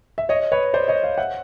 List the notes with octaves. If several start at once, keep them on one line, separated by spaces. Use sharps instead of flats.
E5
C#5 D#5
B4 C#5
C5 D5
C#5 D#5
D#5 F5
E5 F#5